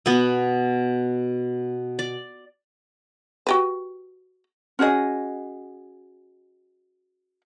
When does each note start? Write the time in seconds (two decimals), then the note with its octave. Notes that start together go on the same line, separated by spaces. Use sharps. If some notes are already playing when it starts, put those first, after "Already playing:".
0.06 B2 B3
1.99 D5
3.47 F#4 G4 B4
4.79 C#4 F#4 G#4 D#5